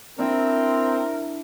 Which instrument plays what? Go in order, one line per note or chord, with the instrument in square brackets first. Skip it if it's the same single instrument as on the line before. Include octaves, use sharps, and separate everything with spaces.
[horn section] C4 [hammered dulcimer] D4 E4 [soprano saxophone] A#4